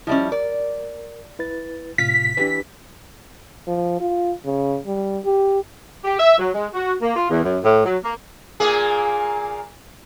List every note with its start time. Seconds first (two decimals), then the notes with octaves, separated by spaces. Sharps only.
0.07 F3 G3 C#4 E4 D#5 E5
0.32 A#4 D5
1.39 E4 B4 A6
1.98 A2 C3 F4 B6
2.37 E3 D4 G4 B4
3.67 F3
4.00 F4
4.45 C#3
4.86 G3
5.25 G4
6.04 G4
6.19 E5
6.38 F#3
6.54 G#3
6.74 F#4
7.01 A#3
7.16 F4
7.30 E2
7.43 F#2
7.64 A2
7.85 F#3
8.03 A#3
8.60 A#2 A#3 G#4